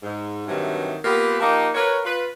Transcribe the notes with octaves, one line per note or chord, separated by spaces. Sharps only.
G#2
G2 C3 D#3 E3 F#3
A#3 B3 F4 G4
F3 A#3 D#4 G4 D#5
F#4 A#4 B4 C#5
F4 B4